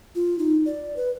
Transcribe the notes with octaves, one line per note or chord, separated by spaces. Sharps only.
F4
D#4
D5
B4